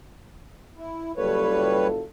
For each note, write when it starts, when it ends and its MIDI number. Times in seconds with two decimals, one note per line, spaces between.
0.78 1.12 64
1.17 2.02 30
1.17 1.88 55
1.17 2.02 65
1.17 2.02 69
1.17 1.88 71
1.17 1.88 73